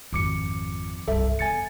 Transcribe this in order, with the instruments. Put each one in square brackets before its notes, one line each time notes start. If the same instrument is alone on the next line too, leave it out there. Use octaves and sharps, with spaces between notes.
[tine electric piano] G#1 D6 C#7 [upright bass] F2 F3
[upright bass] C2 G2 [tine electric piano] A4 E5
[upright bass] E2 [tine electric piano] G#5 A6 C#7